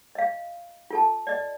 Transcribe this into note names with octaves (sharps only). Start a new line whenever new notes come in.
D#5 F5
F4 A4 A5
D5 D#5